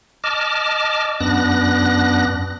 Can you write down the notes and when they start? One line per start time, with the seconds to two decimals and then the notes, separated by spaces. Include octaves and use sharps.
0.24 D#5 A5 D6 F6
1.20 F#2 B3 D4 F#6 A#6